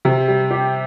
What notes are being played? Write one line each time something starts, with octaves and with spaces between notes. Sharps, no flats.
C3
G3
G4